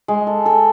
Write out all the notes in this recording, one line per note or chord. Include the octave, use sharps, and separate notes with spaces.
G#3
A4
A4